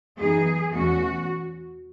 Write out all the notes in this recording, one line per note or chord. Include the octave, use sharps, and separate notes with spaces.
F#2 E3 B3 D#4 G#4
E2 B2 A3 C#4 F#4